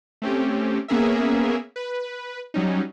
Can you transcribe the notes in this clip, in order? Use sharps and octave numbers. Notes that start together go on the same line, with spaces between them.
A3 C4 C#4 G4
A#3 B3 C#4 G#4 A#4 E5
B4
F#3 G3 C#4 D#4